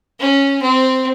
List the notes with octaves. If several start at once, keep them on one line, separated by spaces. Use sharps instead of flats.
C#4
C4